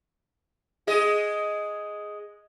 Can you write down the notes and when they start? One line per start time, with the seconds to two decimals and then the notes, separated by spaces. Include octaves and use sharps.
0.87 G#3 G#4 D#5